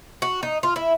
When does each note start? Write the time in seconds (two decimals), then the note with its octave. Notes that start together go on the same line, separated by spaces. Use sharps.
0.22 F#4
0.43 D#4
0.63 F4
0.76 E4